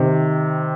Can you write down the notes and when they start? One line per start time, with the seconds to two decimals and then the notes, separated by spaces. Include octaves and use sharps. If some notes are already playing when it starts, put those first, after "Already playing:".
Already playing: C3 D#3